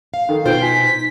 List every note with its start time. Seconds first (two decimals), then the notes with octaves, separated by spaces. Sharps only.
0.14 F5
0.29 D#3 A4
0.45 B2 D#4 F4 C5 G5
0.62 G#5 B6